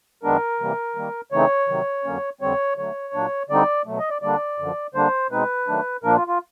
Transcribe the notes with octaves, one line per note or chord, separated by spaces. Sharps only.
F#2 D#3 G#3 B3 D4 A#4
C3 E3 G3 A#3
D#3 G3 A#3
C#3 E3 A3 C4 D#4 C#5
C3 D#3 F#3
F2 D3 F#3 A#3 C#4
F2 D3 G3 C4 C#5
D3 F#3 A3 C#5
A#2 F#3 A#3 D4
D3 G3 C4 D#4 D5
B2 F#3 A3
D#5
D5
D3 G3 A#3 D4 D5
F#2 D3 F3
D3 G3 A#3 D4 C5
B2 G#3 C4 D#4 B4
D#3 F#3 A3 D4
A#2 F3 A#3 D4 A#4
F4
F4